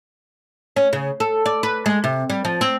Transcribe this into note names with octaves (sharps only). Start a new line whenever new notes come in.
C#4
C#3
A4
D5
B4
G#3
C3
G3
F3
C4